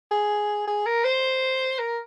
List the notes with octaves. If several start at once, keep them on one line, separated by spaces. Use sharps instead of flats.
G#4
G#4
A#4
C5
A#4